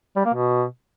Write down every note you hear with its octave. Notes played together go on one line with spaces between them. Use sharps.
G3
A#3
B2